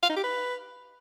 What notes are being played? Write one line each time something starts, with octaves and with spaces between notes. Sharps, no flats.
F5
D#4
G4
B4